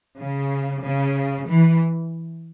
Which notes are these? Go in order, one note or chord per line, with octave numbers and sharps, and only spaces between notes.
C#3
C#3
E3